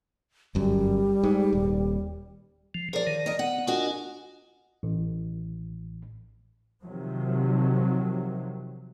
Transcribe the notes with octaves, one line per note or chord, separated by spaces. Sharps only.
G1 F#2 G3
G#2
D#1
F3
F3 G#4 A#4 D5 A#5
D#3
A#4 D#5
B3 F#5
D4 F4 F#4 A#4 D#5 G#5
A1
C3 D#3 F3 F#3